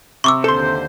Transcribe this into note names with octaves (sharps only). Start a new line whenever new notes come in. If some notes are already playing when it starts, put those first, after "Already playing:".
C3 C#6 D6 E6
D#2 D3 A4 C5 C6